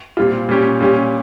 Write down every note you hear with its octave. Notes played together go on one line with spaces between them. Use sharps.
A#2 G3 C4 F4
A#2 G3 C#4 G4
A#2 G3 C#4 G4